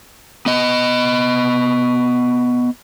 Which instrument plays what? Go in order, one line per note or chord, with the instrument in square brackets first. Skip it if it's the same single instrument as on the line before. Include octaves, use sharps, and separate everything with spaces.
[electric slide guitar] B3 D#5